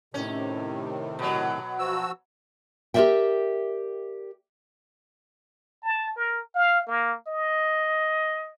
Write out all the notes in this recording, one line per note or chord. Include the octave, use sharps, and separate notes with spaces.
A2 C3 D#3 C#4
B2 F#3
F3 F#4 E6
G4 A#4 C5 D5 E5 G5
A5
A#4
F5
A#3
D#5